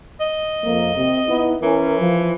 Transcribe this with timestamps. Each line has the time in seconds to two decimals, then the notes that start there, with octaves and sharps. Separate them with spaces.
0.20 D#5
0.64 F2 F3 A#3
0.96 C3
1.28 B3 D#4 E4
1.62 E3 C#4 E4 A#4
1.99 F3